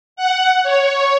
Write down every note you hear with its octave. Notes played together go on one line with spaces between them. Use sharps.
F#5
C#5